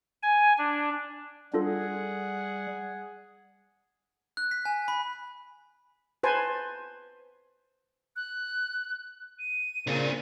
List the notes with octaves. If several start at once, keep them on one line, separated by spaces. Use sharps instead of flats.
G#5
D4
G3 D4 F4 G#4 A4 F#5
F#6
B6
G#5
B5
B4 C5 G#5 A5
F#6
D#7
A#2 C#3 C4 D4